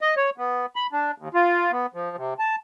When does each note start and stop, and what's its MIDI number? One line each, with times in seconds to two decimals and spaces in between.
0.01 0.15 75
0.17 0.30 73
0.38 0.66 59
0.76 0.87 83
0.93 1.11 62
1.18 1.29 39
1.34 1.71 65
1.72 1.86 59
1.94 2.16 53
2.17 2.34 48
2.39 2.56 81